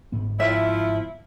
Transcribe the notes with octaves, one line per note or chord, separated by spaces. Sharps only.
G1 G#2 B3
F3 E4 F4 E5